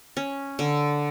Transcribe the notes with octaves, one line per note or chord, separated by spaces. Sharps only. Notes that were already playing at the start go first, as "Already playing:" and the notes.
C#4
D3